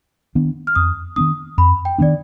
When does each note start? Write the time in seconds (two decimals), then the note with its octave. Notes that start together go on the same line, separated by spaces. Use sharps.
0.35 D#3 B3 D4
0.67 F6
0.75 F2 D#6
1.16 D#3 B3 D4 D#6
1.58 F2 B5
1.85 G5
1.98 D#3 B3 D4 D5